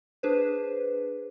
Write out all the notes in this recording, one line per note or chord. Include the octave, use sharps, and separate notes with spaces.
D4 G#4 B4 C5